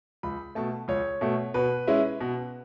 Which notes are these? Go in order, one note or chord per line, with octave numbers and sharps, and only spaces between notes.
C#2 B5
B2 A3 A5
C#2 C#5
B2 A3
B2 B4
G#3 C#4 E4
B2